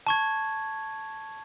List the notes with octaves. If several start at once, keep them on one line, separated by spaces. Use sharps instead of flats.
A5 C#6 G#6